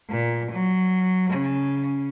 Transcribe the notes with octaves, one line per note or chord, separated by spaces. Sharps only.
A#2
F#3
C#3